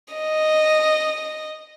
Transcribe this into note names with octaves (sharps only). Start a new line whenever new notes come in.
D#5